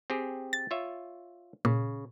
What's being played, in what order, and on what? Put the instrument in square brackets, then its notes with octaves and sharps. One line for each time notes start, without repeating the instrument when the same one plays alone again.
[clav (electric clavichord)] C4 G4 G#4
[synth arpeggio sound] A6
[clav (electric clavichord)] F4 C#5 E5
[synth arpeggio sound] A#2 [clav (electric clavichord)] C#3